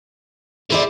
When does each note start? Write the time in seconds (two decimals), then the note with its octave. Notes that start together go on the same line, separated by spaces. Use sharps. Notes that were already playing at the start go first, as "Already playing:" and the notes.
0.70 A#2 E4 G#4 C5 D5